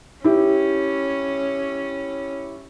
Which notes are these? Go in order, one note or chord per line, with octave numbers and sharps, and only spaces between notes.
C#4 E4 G4